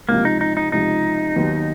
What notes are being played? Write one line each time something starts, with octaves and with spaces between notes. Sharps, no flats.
C#2 C3 F3 A#3
D#4
D#4
D#4
C#2 C3 F3 D#4
D#2 D#3 F#3 B3